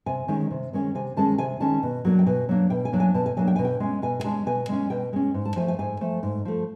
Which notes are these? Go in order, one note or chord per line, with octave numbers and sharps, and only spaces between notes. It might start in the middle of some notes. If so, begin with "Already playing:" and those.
C3 G#5
D#3 G#3 C#4
C3
D#3 G#3 C#4
C3 G#5
D#3 G#3 C#4 A5
C3 G#5
D#3 G#3 C#4 A5
B2
F#3 A#3 D4
G5
B2 G#5
F#3 A#3 D4
B2 G5
G#5
F#3 A#3 D4
G#5
B2 A5
G#5
F#3 A#3 D4 G#5
G5
B2 G#5
G5
G#3 C#4
B2 G#5
G#5
G#3 C#4 A5
B2 G#5
G#3 C#4
B2 G5
G#3 C#4
G#2
A5
F3 A3 G#5
G#5
G#2 G#5
F3 A3
G#2
F3 A3